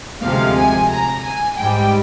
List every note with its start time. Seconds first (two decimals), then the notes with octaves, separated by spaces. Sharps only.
0.22 D2 C3 F3 G#3 F5
0.56 G#5
0.90 A#5
1.25 G#5
1.58 G#2 G3 G5